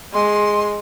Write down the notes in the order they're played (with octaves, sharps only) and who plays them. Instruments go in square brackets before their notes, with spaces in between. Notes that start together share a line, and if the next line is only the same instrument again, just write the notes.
[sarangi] G#3 [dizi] C6